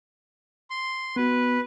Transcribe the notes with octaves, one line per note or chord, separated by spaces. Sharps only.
C6
B3 F#4 B4